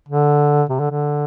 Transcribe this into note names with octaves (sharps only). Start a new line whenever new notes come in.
D3
C3
D3
D3